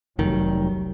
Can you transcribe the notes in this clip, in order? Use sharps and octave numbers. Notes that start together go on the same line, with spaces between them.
F1 C2 D#3 F#3 G3